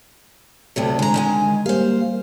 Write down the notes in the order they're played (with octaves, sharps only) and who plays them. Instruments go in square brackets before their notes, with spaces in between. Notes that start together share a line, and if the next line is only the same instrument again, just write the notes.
[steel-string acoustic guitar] D2 C3 F#3 [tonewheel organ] A4
[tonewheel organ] D3 [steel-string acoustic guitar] G#3 A#5
[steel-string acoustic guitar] D#3 G#3 G#5
[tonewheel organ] G3 A#3 [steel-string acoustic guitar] C5 F5